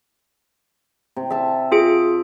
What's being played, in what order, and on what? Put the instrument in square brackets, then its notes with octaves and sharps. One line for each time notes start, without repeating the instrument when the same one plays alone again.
[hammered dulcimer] C3
E5 A5
[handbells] F4 G#4 D7